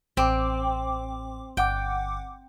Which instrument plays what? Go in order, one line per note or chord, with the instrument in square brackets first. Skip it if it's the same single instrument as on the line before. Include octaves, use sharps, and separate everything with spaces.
[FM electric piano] A1 D6 [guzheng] C4
[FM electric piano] G1 F#5 D6 [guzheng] G5